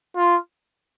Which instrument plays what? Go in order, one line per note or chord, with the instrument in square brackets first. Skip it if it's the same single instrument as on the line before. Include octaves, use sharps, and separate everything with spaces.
[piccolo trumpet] F4